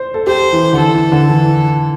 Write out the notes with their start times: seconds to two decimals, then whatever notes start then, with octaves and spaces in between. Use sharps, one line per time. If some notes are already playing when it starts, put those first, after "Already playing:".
Already playing: C5
0.14 A4
0.27 G4 C5
0.52 E3
0.66 E3
0.73 D3
0.78 E3 A4
0.95 E3
1.12 D3
1.29 E3